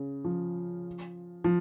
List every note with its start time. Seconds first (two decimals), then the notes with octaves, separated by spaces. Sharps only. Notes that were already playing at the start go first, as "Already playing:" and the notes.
Already playing: C#3
0.25 F3
1.44 F3